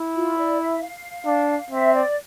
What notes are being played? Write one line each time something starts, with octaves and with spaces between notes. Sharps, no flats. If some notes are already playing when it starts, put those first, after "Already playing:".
Already playing: E4
F4
D5
E5
F5
D4
C4 E5
D5